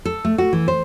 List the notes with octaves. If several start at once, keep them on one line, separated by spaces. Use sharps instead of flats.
A4
A3
F#4
E3
C5